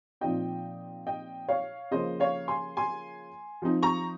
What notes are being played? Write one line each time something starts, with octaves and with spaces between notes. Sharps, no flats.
A#2 F3 C4 D#4 D#5 G5
D#5 G5
C#5 F5
C#3 F3 A#3 C#4 C5 D#5
C#5 F5
G#5 C6
G#5 C6
F3 C4 D#4
A#5 C#6